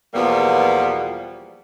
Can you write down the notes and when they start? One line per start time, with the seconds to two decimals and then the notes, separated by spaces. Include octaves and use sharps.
0.14 E2 B2 F3 G3 A#3 B3